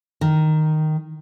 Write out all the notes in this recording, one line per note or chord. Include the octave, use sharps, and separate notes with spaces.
D#3